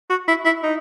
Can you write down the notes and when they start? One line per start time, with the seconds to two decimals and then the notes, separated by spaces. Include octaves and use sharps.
0.10 F#4
0.27 E4
0.45 E4
0.63 D#4